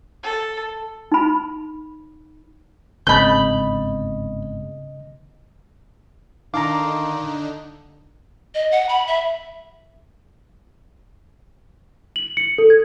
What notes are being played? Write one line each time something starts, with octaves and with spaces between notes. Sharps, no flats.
A4
D#4 B5
G1 G#2 C#3 C4 D#5 B5 G6 A6
D3 D#3 D4 D#4 F5 A5 A#5 D6
D#5
F#5
B5
E5
F#7
C#7
A4
G#6